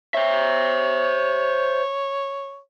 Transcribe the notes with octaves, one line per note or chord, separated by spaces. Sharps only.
C5 C#5 E5